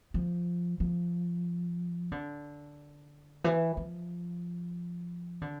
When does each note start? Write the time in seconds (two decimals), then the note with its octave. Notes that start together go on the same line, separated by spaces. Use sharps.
0.14 F3
0.80 F3
2.12 D3
3.44 E3
3.77 F3
5.41 D3